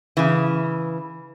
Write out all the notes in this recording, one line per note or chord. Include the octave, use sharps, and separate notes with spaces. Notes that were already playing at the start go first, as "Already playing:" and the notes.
C#3 E3